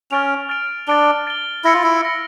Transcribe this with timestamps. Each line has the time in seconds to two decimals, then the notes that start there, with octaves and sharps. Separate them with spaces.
0.11 C#4 F6 A6 D7 F7
0.49 F6 A6 D7 F7
0.88 D4 A6 D7 G7
1.27 A6 D7 G7
1.64 E4 E6 A#6 C#7
1.74 F4
1.84 E4
2.03 E6 A#6 C#7